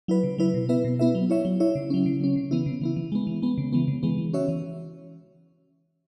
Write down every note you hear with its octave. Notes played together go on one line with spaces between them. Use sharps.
F#3 E4 B4
C#3
F#3 E4 B4
B2
B3 E4 B4 E5
B2
B3 E4 B4 E5
F#3
E4 C#5 E5
F#3
E4 C#5 E5
C#3
F#3 C#4
C#3
F#3 C#4
C#3
E3 B3 E4
C#3
E3 B3 E4
E3
G#3 B3
E3
G#3 B3
C#3
E3 G#3 B3
C#3
E3 G#3 B3
E3
C#4 F#4 C#5 E5
E3